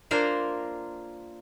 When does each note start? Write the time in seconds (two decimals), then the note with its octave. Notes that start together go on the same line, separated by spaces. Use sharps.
0.11 A#3 D4 F4 A#4 C5